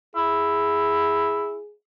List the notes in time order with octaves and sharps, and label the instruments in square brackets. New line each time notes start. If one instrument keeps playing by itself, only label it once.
[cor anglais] E4 [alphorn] G#4